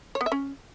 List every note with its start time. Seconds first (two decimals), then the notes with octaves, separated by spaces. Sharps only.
0.15 C#5
0.21 B3
0.26 E5
0.32 C#4